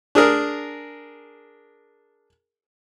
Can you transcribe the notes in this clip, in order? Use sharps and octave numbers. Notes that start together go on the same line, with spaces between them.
D4 G#4 A#4